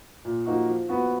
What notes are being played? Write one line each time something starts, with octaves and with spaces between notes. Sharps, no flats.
A#2
F3 A#3 D#4 F#4
F3
B3 F#4